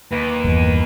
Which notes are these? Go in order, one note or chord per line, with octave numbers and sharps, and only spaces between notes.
D#2 B4
G1 E2 G2